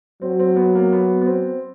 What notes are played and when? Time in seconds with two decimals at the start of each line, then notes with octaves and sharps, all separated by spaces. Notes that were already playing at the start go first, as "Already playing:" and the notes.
0.22 F#3 C4
0.39 C4
0.56 B3
0.75 A#3
0.92 B3
1.21 B3
1.26 C4